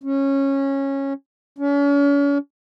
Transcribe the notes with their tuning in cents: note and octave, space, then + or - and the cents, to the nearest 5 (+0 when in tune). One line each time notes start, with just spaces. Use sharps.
C#4 -15
C#4 +40